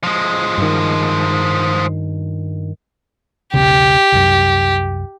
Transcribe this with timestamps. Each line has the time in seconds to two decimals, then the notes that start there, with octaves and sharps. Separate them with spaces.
0.04 F3 G#3
0.58 G2 D#3
3.54 E1 B1 C#3 G4
4.12 C2 F#2